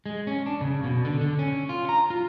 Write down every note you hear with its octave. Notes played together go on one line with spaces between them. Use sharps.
G#3
C#4
D4
C#3
B2
D3
D3
C#4
F4
A#5
F4